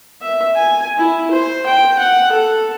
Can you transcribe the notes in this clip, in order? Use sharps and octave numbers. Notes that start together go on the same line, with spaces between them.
E5
G#5
E4
C5
G5
F#5
A4